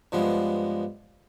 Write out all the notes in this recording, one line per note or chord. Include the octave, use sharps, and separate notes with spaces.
G2 F3 G#3 B3